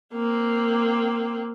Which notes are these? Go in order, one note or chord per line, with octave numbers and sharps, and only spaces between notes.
A#3 C4